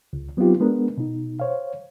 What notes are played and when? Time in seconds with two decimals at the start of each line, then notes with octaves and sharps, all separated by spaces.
0.13 C#2
0.37 F#3 B3 C4 D#4 F4 G4
0.60 G#3 B3 D4 A#4
0.97 B2 D#4
1.40 C5 C#5 F5